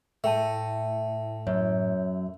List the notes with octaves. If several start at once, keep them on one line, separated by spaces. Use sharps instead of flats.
A2 A3 E5 G5 A5
F#2 C#5